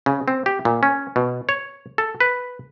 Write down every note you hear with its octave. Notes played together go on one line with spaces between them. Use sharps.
C#3
C4
G4
A#2
C#4
B2
C#5
A4
B4